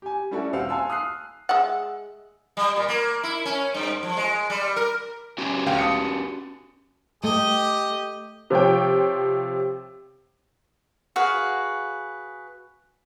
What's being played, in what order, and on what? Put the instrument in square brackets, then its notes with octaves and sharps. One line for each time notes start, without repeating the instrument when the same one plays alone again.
[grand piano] G4 G#5
G3 C#4 D4 E4 F#4 A4
D#1 C4 F5 F#5 E6
F5 G#5 A5 C6 E6
D#6 F6 F#6 C7
[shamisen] G#3 E5 F#5
[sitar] G3
A#2
A#3
E4
C#4
G2
F3
G#3
G3
A#4
[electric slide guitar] C#4 F#4 G4
[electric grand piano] D2 F5 G5
A5 D#6 C#7
[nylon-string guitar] A3 [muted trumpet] G4 [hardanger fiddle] D#5
[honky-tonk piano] C3 F3 C#5 G5
[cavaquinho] F#4 G#4 B4 F5